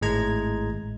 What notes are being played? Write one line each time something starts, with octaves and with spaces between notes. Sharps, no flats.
G#1 A2 G#3 A#5 G#6